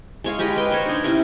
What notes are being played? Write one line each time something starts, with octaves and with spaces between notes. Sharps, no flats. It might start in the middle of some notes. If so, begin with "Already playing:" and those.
G#3 C#5 F5
G#3 G4 D#5 B5
B4 G5
A#4 C5 C#5
D4 D#4
C3 C#4 E4